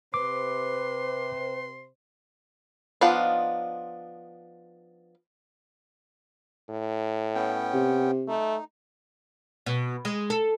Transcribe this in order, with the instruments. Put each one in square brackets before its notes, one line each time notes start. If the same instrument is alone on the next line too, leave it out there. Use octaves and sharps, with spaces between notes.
[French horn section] C3 C5 [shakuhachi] B4 [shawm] C6 [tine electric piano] D6
[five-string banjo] F3 B3 D4 D#4 F4
[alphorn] A2
[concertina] B3 C#4 G5
[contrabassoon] C3
[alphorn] A3 [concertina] D#4
[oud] B2
G#3
A4